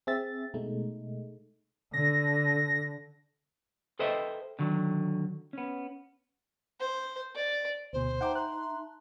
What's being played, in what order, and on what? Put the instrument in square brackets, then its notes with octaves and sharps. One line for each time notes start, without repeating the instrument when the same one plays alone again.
[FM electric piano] C4 G#4 E5 A6
B2 G#3 A3 D#4
[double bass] D3 [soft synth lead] A#6
[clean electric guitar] A4 B4 C5 D#5 E5 G5
D3 D#3 F#3
B3 C#4
[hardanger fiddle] C5
D5
[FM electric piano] D2 B2 [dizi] C5
[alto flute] D#4 [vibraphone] E5 A5 A#5 [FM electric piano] F#5 G5 D6
[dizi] C6 [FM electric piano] F#6